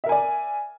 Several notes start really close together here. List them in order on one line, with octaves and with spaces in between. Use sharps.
E5 A#4 G#5 D5